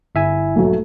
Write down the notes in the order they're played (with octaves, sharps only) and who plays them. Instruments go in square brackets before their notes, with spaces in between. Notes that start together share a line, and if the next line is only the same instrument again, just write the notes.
[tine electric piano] G1 E5 G#5 [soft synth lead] E4
[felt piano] B1 F#3 [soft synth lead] A3